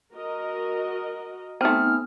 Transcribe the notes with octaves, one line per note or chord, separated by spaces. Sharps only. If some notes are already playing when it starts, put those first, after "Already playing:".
F#4 A#4 D#5
A3 B3 C4 D#4 G#5 F6